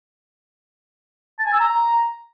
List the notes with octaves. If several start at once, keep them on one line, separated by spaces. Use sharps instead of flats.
A5
G#5
E6
A#5